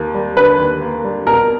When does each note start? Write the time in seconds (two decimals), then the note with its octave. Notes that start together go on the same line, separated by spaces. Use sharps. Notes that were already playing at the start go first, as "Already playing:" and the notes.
Already playing: D#2 A#3
0.14 G3
0.37 D3 B4
0.59 D#2
0.82 A#3
1.05 G3
1.26 B2 A#4